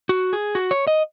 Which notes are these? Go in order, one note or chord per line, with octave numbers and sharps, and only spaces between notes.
F#4
G#4
F#4
C#5
D#5